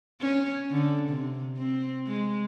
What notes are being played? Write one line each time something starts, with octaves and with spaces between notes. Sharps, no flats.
C#4
D3
C3
C4
G#3